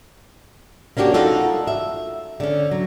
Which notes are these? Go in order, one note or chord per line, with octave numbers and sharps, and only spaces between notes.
A#3 C#4 D4 F#4 G4
D#4 F4 F#4 A4
E5
D3 C#4
F#3